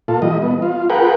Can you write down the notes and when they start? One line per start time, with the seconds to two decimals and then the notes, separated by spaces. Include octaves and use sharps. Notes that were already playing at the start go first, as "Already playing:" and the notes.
0.08 A#2 F4 A4
0.22 E3 G3 D#5
0.42 B3
0.62 F4
0.90 F4 G#4 A#4 B4 F#5 G5